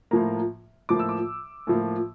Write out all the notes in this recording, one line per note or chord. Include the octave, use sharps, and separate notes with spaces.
A2 F3 A#3 A#5
A2 F3 A#3 D6
E6
D6
A2 F3 A#3